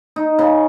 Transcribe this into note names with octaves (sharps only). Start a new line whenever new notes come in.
D#4
C#3